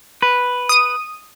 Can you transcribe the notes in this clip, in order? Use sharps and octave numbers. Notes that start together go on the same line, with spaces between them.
B4
D#6 D#7